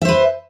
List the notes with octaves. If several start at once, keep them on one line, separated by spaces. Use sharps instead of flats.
B4 C5 E5